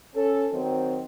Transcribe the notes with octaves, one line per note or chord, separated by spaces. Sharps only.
C#4 A4
D#3 F#3 C4